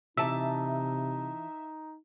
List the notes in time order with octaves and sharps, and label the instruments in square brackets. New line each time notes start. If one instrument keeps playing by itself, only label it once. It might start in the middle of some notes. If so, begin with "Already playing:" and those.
[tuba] C3 [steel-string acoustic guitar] E3 A5 [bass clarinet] D#4 [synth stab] E5